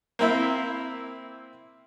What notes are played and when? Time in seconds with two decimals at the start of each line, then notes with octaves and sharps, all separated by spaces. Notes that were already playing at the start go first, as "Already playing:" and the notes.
0.19 A#3 C4 E4